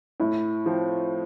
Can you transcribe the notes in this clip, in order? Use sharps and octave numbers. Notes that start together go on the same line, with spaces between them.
A2 E4
F3 C4